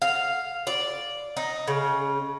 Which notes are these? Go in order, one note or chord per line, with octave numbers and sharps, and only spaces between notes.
F5
D5
D#4
C#3